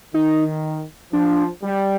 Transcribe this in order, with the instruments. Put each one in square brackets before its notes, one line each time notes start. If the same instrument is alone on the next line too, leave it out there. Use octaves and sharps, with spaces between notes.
[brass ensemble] D#3 [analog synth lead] D#4
[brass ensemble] F3 [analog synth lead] D4
[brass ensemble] G3